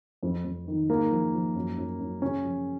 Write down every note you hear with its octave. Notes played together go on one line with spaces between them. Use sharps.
F2
F2
D#3
G#2 A#3
F3
F3
F#2
F#2
F#2
C#3 C#4
F3